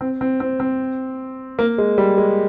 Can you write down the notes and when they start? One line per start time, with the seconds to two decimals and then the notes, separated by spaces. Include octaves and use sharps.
0.01 C4
0.21 C4
0.40 C4
0.60 C4
1.59 A#3
1.78 G#3
1.98 G3
2.18 G#3